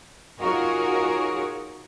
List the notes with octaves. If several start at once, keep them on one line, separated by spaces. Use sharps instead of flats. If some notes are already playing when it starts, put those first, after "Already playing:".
D#4 F4 F#4 G#4 A#4 C#5